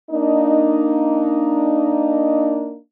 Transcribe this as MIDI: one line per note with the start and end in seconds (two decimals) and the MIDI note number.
0.10 2.76 58
0.10 2.76 62
0.10 2.76 63